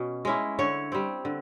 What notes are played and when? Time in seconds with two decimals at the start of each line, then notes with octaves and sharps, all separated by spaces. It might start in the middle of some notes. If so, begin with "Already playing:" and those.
Already playing: B2 C#4
0.25 G#3 C#4 E4
0.59 D3 C#5
0.92 G3 C4
1.25 D3